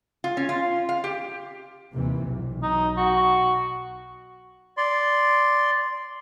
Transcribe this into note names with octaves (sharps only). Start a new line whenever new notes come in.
F4
C#4
F4
F5
G4
D#2 C3 E3
B1
D#4
F#4
D5 C6